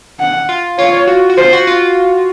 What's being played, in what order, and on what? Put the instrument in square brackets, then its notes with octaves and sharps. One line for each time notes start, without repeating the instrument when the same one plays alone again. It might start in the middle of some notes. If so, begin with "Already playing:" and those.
[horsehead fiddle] F#5
[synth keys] F4
[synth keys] F4 [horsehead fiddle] C#5
[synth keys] F#4
F#4
[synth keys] F4 [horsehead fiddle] C5
[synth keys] F#4
F4